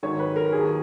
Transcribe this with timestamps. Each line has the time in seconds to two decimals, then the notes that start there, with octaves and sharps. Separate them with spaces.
0.03 G#2 D#3 F#3 C#5
0.19 B4
0.36 A#4
0.52 D#2 D#3 F#3 G#4